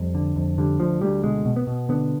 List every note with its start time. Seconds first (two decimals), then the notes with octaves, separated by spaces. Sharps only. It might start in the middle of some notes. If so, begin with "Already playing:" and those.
Already playing: F2 G3
0.15 D3
0.36 F2
0.58 D3 G3
0.80 D2 F3
1.01 D2 G3
1.24 B2 G#3
1.45 B2
1.56 B3
1.67 B2
1.89 D3 B3